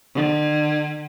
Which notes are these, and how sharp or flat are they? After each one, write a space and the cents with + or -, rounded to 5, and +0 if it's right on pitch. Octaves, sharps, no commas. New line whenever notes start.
D3 +40